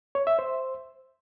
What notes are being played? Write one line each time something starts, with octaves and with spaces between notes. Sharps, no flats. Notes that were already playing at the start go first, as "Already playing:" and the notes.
C#5
E5
C5